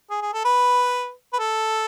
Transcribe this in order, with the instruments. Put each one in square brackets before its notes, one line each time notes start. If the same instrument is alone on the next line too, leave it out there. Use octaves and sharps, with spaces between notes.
[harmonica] G#4
G#4
A4
B4
B4
A4